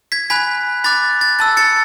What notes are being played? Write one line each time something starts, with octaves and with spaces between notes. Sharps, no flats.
G#6 B6
G#5 B5 F#6 G#6 B6
B5 D6 F#6 A6
A6
A5 E6 A6
A6 C#7